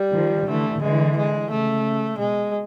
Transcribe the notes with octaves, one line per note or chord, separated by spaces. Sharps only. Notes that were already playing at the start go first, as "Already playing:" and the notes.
Already playing: G3
D#3 F3
D3 E3 A3
D3 E3 G#3
G#3
C#3 A3
B2 G#3